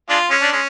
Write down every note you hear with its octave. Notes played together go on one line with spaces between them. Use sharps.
G#3 D4 F4
G#3 C#4
D4
G#3 C#4